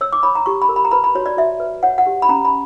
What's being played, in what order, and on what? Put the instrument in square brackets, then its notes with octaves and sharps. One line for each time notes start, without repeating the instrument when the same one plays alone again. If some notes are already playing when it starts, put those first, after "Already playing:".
[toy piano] C#5 E6
D6
C#5 B5
A#5
G4 C#6
B5
A#4
B5
A#5
B4 B5
B5
F#4 C#5
D5
F#4 E5
B4
C#5 F#5
F#5
G4
B5
C#4 A#5
B5